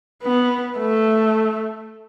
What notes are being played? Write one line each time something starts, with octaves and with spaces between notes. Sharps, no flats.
B3
A3